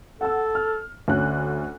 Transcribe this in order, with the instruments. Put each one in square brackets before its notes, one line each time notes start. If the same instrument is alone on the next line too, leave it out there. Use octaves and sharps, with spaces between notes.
[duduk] A4 [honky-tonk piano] F#5 E6
[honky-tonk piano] F6
[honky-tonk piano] D2 C#4 F#6 [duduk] D3